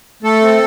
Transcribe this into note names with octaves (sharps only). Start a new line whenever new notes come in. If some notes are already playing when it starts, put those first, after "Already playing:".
A3 A4
C4